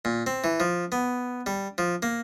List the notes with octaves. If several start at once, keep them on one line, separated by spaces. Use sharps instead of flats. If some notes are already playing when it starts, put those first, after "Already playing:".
A#2
C4
E3
F3
B3
G3
F3
A#3